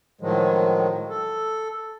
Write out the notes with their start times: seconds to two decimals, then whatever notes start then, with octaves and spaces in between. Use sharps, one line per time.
0.21 A2 D#3 F3 F#3 G#3
1.10 A4